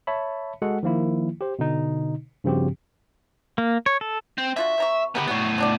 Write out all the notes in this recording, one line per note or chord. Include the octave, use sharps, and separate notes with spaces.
C#5 E5 A5 B5
G#3 F#4 A4 F#5
D#3 F3 A#3 E4
G4 C5
B2 D3 D#4
G2 C#3 F3 C4 F#4 G4
A#3
C#5
A4
C4
D3 F4 F#4 E5
C3 A#5 C#6
B3 G4 A#4 F#5 B5
A2 F#3 G3 B3 C#6
F#3 D4 D5